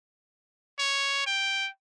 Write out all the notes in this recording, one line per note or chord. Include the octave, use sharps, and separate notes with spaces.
C#5
G5